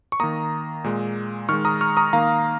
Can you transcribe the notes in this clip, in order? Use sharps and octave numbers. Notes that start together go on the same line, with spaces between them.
C#6
D#3 A#3 A#5 D#6
A#2 G#3
D#3 G#3 C#6 F6
A#5 D#6
C#6 F6
A#5 D#6
D#3 A#3 F5 A#5